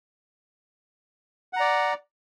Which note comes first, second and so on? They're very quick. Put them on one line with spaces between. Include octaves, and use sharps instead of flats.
F#5 A#5 D5